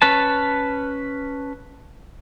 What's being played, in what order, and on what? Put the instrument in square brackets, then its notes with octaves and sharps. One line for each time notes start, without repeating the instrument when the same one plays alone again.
[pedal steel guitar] C#4 B4 A5